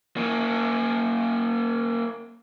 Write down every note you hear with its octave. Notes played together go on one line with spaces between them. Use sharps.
A#3 C#4